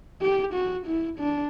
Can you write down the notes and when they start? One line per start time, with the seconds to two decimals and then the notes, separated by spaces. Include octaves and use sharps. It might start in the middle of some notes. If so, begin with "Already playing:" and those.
0.21 G4
0.54 F#4
0.86 E4
1.19 D4